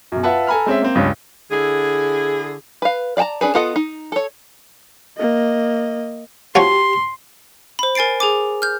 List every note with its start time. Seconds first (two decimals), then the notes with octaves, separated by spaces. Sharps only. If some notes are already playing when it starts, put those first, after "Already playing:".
0.12 B1 F#2
0.23 F4 B4 E5 F#5 A5
0.47 A4 G#5 A#5 B5 F6
0.66 G#3 C4 C#4 E5
0.82 A#3 C4
0.95 C#2 G2 C#4
1.51 D3 E4 G#4
2.82 B4 F5
3.17 D5 F5 G5 A5 A#5
3.41 C#4 D4 G#4 B4
3.54 B3 F4 A4 D#5 F#5
3.76 D#4
4.12 A4 C#5
5.17 A#3 D#5
6.55 F3 F#4 G4 C#5 C6
7.79 C5 B5
7.95 A#4 G#5 A6 C7 D7
8.20 G#4 G#5 D6
8.62 F6 G6